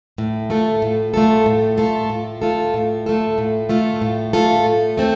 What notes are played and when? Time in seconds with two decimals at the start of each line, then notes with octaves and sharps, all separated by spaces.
0.18 A2
0.50 A3 F4 A4
0.82 A2
1.14 A3 F4 A4
1.46 A2
1.77 A3 F4 A4
2.10 A2
2.42 A3 F4 A4
2.74 A2
3.06 A3 F4 A4
3.38 A2
3.69 A3 F4 A4
4.01 A2
4.33 A3 F4 A4
4.66 A2
4.97 A3 C4 A4